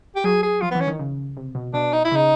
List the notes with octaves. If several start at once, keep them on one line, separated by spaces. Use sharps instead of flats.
G4
F#3 G#4
G#4
F3 F4
B3
E3
C#4
D#3
C#3
C3
B2
B2 D4
D#4
E4
C#3 D#4